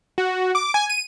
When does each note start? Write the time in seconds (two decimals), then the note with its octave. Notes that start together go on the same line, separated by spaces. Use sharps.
0.18 F#4
0.55 D6
0.74 G#5
0.89 D#7